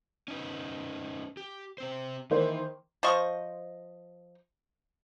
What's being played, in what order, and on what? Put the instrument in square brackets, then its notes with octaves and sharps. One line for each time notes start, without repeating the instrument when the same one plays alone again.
[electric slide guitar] C#4 D#4 B4
G4
C3 C4 C5
[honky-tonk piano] D#3 A#3 C5 [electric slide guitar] E3
[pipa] F3 C5 D#5 C#6